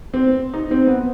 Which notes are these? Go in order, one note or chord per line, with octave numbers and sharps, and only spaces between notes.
C4
D#4
C4
B3